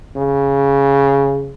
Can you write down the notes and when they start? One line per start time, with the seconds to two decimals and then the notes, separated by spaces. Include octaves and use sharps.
0.16 C#3